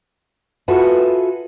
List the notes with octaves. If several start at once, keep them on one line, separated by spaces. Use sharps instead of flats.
F4 F#4 G#4 A4 B4 E5